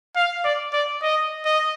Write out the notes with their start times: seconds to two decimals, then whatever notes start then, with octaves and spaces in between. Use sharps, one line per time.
0.16 F5
0.45 D5
0.73 D5
1.03 D#5
1.45 D#5